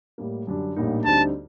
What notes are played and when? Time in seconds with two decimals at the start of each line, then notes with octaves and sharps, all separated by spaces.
0.18 A2 G3 A#3
0.47 F#2 D3 G3 D4
0.76 A#1 A2 G3 A#3 D#4
1.05 D2 D3 G3 C4 D#4 A5